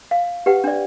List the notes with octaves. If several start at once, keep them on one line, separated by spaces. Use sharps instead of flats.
F5
G4 B4 F#5
D4 D5